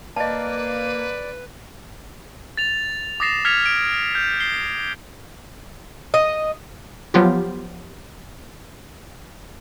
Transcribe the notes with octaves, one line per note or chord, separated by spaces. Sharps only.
A#3 B4 D5 D#5 A5
A6 F7
D6 D#6 A6 A#6 C7 E7
F6 G#6 B6 C#7 F7
D7
F6 G6
C7 G7
D#5
F3 F#3 B3 F4 G4